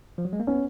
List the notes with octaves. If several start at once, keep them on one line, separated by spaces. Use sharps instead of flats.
F3
F#3
G#3
A#3
B3 C#4